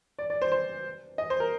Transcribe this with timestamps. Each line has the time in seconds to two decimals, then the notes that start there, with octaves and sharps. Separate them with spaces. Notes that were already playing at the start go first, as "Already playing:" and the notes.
0.19 D5
0.30 D5
0.42 C5
0.52 C5
1.18 D#5
1.30 C5
1.40 A#4